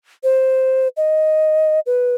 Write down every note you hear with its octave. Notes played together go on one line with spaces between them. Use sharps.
C5
D#5
B4